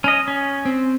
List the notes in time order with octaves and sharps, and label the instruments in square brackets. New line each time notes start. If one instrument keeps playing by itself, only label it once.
[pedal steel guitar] C#4 D#5
C#4
[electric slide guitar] C4